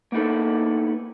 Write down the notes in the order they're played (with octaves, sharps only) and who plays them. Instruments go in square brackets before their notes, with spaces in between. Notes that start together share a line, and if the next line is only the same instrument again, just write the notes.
[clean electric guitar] A#3 B3 D#4 E4 A4